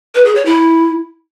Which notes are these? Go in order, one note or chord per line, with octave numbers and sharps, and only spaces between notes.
B4
G#4
C#5
E4